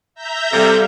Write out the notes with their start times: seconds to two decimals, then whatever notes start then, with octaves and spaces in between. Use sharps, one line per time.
0.15 E5 A#5 G6
0.52 C3 G3 A4 F5